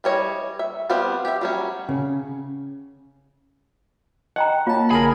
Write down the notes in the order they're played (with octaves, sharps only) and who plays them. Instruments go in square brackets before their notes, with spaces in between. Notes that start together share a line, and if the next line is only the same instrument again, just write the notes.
[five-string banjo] E3 G3 C#5 D#5
E5
G3 B3 C4 G4 F5
G4 E5
F#3 G3 C#4
[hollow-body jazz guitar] C#3
[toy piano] D#5 G5 A#5 [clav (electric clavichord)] F#5
[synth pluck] A#3 A5 [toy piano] F4 C#5 F5
[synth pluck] B1 D3 G#5 [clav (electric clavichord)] G#4 A#4 [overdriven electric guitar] B5